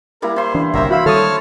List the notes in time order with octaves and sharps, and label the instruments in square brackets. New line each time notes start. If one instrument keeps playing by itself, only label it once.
[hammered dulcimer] G3 A#3 E4 [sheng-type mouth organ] A#4
[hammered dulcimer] E4 C6 [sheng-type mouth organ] C5
[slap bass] E3 [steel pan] D4
[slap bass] G1 C2 [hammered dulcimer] F#3 C5 [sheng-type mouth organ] A#4 E5
[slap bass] E3 [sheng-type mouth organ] E4 B5 [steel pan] F#4 F5 E6
[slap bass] D#3 G3 [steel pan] A4 D#6 [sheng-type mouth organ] C#5 A5 F6